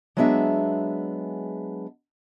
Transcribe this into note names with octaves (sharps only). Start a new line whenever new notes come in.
F#3 G#3 B3 D4 G#4 E5